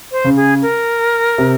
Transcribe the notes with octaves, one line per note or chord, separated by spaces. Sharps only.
C5
C#3
G#4
A#4
C3